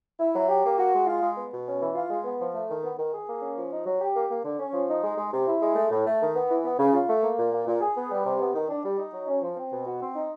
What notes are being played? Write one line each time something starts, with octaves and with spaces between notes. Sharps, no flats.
E4
F#3
G4
A#3
F#4
G#3
F4
G#3
B3
B2
C#4
E3
F4
G#3
B3
F3
A3
D#3
B3
D#3
G#4
A#3
C#4
F3
D#4
F#3
G4
A#3
A#3
D3
C#4
F3
D#4
G#3
G#3
C3
E4
G#3
A3
A2
A3
D#3
B3
E3
B3
C#3
F4
A3
A#3
A#2
A#3
A#2
G#4
B3
G3
C3
B3
D#3
D4
G3
D#4
F#3
C#4
F3
C4
B2
F#4
C4
D#4